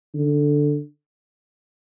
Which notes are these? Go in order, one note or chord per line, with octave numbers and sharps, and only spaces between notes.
D3